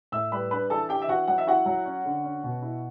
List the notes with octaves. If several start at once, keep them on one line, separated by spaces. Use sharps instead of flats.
A2 E5 E6
G3 B4 B5
D4 B4 B5
E3 A4 A5
D4 G4 G5
E5
E3 F#4 F#5
F#3 F#5
E5
E4 F#4 F#5
F#3
C#4
D3
C#4
B2
E4